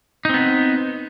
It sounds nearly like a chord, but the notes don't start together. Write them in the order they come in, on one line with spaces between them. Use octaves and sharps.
D#4 C4 B3